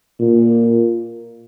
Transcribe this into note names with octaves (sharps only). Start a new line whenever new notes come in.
A#2